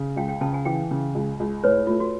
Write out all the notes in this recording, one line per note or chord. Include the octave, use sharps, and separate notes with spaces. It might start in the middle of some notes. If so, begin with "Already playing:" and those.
Already playing: C#3
C#2 F5 G5
F5 G5
C#3 G5 A5
F#5 G#5
E3 F5 G5
C#3
C#2
C#2
A2 B4 C#5
A3 F4
F#4